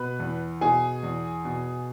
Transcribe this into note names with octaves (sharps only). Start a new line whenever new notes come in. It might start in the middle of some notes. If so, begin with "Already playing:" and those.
Already playing: B2 B4 B5
E2
B2 G#4 G#5
E2
B2